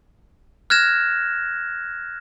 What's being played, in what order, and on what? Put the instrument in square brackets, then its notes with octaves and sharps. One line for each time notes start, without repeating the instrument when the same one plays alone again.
[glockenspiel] F6 F#6 G#6 A#6 E7